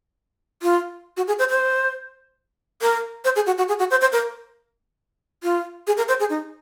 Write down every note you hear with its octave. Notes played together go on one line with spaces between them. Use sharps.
F4
F#4
G#4
C5
C5
A#4
C5
G#4
F#4
F#4
G#4
F#4
C5
C5
A#4
F4
G#4
A#4
C5
G#4
D#4